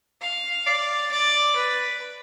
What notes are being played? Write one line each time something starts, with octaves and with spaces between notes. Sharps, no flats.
F5
D5
D5
B4